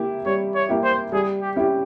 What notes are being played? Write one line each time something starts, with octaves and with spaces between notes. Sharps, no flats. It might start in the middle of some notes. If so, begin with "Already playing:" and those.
Already playing: A#3 E4 G4
G3 C#5
C#5
A#3 E4 G4
C5
G3 G#4
G4
C#4 E4 G4